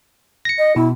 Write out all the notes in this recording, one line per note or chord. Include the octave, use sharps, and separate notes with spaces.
A#6 C#7
D#5
B2 E4